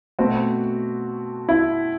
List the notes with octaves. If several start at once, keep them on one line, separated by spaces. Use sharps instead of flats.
B2 A3 C4 F#4
E4